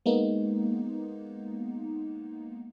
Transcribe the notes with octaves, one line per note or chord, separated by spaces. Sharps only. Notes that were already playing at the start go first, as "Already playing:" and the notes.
G#3 A#3 B3 D#4